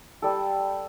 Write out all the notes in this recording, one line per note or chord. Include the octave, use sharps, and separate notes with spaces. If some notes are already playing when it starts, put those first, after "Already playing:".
G3 A4